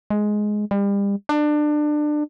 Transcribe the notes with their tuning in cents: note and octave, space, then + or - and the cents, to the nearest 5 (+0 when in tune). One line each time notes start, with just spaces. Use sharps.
G#3 +10
G3 +35
D4 +25